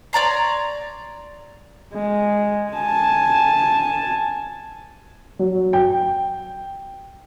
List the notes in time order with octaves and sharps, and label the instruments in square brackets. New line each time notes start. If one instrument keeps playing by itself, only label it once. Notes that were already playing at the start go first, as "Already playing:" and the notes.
[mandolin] C#5 D5 A#5 C6
[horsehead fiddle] G#3
G#5 A5
[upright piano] F#3
G5